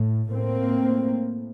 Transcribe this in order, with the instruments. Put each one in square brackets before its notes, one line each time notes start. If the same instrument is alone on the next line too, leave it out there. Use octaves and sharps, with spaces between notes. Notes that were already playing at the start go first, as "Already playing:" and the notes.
Already playing: [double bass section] A2
A2 A#3 C4